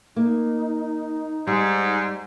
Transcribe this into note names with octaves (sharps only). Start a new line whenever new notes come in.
A#3 D#4
G#2 G3